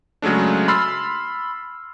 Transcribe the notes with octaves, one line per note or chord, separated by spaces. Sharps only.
C#3 F#3 G#3 A3 D4
B5 C6 E6 F6 A6 C7